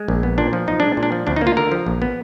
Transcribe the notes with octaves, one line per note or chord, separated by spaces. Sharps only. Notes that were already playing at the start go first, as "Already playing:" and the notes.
Already playing: G#3
A#1
B3
A#2 D4
F3
B1 D#4
G#3 D4
A#2
D4
F3
D2 D4
D#4
A#3
F4
D3 A#4
F3
A#1
B3